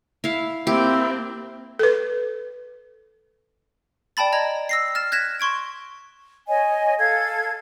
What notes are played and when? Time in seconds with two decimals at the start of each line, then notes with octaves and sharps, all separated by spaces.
0.24 E4 F5
0.67 A#3 C4 E4 G4
1.79 A4 B4
4.17 D5 G5 A5 B5 A6
4.33 D#5 A#5 G#6
4.69 E6 A#6 C7
4.95 F6 A6 E7
5.12 F#6 G#6 A#6 B6 E7
5.40 C6 C#6 G#6 D7
6.48 C#5 D#5 G#5
6.99 A4 F5 G#6